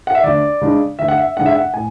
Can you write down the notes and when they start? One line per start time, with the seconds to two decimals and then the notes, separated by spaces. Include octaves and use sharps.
0.07 F#5
0.15 E5
0.23 D2 D5
0.61 C#3 G#3 D4
0.99 D2 E5
1.08 F#5
1.18 E5
1.37 C#3 G#3 D4 F#5
1.46 E5
1.55 F#5
1.74 A2 G#5